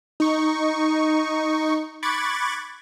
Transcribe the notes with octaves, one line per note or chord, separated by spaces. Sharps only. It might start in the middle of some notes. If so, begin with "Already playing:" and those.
D#4 C#6
B5 C#6 D6 F#6 G#6 A6